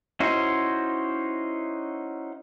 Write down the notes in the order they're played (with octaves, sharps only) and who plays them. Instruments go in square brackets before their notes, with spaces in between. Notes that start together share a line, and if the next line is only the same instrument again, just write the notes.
[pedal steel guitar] C#4 D#4 E4 F#4 C5